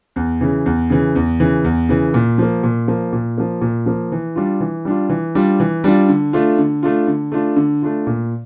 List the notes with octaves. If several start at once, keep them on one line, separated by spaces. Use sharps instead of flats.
E2
C#3 E3
E2
C#3 E3
E2
C#3 E3
E2
C#3 E3
A#2
F3 A#3
A#2
F3 A#3
A#2
F3 A#3
A#2
F3 A#3
E3
G3 D4 F4
E3
G3 D4 F4
E3
G3 D4 F4
E3
G3 D4 F4
D3
A3 D4 F4
D3
A3 D4 F4
D3
A3 D4 F4
D3
A3 D4 F4
A#2